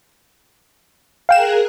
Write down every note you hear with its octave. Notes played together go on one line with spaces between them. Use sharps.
G#4 A#4 F5 G5 F#6 E7